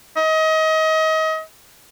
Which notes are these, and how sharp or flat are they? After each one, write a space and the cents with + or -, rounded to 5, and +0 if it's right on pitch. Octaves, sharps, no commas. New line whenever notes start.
D#5 +30